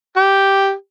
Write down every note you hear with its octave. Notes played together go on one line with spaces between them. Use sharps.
G4